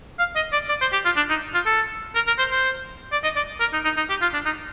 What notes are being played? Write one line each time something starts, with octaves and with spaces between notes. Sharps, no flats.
F5
D#5
D5
D5
C5
G4
F4
D4
D#4
F4
A4
A#4
A#4
C5
C5
D5
D#5
D5
A#4
D#4
D#4
D#4
G4
F4
D4
D#4